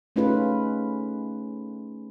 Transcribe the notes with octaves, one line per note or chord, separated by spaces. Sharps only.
A3 C#4 D#4 F4 G#4 B4